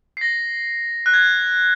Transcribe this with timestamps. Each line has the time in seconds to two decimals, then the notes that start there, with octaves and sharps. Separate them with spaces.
0.17 C7
0.21 A#6
1.06 F#6
1.14 G#6